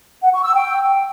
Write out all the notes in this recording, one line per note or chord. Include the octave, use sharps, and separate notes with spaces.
F#5
C#6
E6
G5